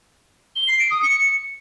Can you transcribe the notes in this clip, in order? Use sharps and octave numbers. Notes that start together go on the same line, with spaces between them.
G7
C7
D7
D#6
C#7